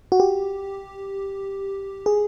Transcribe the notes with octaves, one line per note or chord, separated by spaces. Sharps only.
F#4
G4
G#4